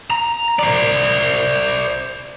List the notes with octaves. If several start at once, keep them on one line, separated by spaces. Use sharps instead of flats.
A#5
C5 D5